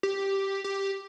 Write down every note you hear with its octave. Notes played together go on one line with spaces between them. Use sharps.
G4
G4